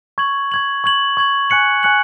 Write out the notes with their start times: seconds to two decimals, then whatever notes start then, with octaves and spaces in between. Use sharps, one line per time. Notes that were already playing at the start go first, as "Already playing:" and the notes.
0.18 C#6 G#6 F#7
0.52 C#6 G#6 F#7
0.84 C#6 G#6 F#7
1.17 C#6 G#6 F#7
1.50 G#5 C#6 F#6 C#7 F#7
1.83 G#5 C#6 F#6 C#7 F#7